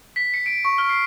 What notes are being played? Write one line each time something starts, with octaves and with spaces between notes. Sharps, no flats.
B6
C#7
D7
C#6
F6
C7